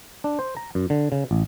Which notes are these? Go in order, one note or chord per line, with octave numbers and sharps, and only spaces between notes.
D4
C5
A#5
F#2
D3
C#3
A1